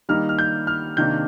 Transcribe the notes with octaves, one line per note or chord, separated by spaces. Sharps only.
D#3 G3 A#3 D#4 F6
F6
G6
F6
C3 D#3 A#3 D4 G6